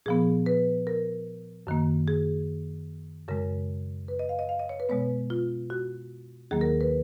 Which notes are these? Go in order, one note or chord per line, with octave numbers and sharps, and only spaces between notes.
A#2 F3 B3 G#4
B4
A#4
F#2 D#3 A#3
G#4
F#2 C#3 G#3 A#4
B4
D#5
F5
D#5
F5
D#5
C#5
B4
B2 G#3 B3 C#5
F4
F#4
D#2 D#3 F#3 A#3 G#4
A#4
B4